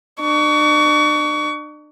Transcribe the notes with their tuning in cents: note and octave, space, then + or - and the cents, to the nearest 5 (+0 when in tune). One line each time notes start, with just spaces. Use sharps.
D4 +40 C#6 +30